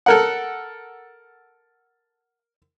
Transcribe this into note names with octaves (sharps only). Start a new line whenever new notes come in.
A4 A#4 F#5